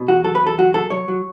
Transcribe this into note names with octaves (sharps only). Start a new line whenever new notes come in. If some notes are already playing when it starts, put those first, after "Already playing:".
Already playing: B2
E2 F#4
F#3 A4
B4
E2
A4
F#3 F#4
F#3 A4
F#3 C#5
F#3